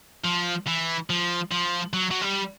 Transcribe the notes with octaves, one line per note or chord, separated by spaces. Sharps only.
F3
E3
F3
F3
F#3
F#3
G3